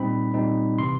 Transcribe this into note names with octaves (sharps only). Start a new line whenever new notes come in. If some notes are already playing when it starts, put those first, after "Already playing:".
Already playing: A#2 G3 C4 D#4 B5
A#2 G3 C4 D#4
C3 E3 C6